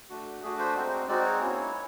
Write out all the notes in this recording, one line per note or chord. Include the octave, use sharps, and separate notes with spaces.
A3 D4 F#4
A3 D4 F#4 G#4
C5
G#3 C4 D#4 F#4
G#3 C4 D#4 F#4 D5
C#5
A#3 C#4 E4